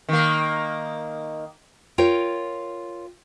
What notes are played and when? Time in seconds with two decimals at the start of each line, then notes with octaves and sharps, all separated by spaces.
0.09 D#3 A#3
1.98 F4 A#4 C#5 G5